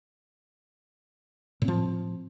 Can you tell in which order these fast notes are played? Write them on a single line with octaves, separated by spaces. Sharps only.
A2 C4 F3